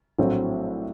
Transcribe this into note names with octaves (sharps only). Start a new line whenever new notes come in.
A#1 A2 F#3 A3 C4